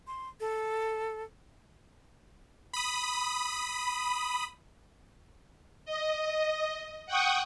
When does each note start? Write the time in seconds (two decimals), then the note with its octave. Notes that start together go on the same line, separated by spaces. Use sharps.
0.07 C6
0.40 A4
2.73 B5 D#6
5.85 D#5
7.06 F#5 G5 C#6 D#6